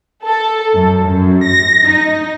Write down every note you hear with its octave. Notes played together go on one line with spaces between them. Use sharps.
A4
F#2
F#2
A#6
D#4